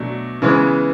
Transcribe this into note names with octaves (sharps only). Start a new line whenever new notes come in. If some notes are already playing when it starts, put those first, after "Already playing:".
Already playing: B2 F#3 A3 D4
C#3 E3 G#3 B3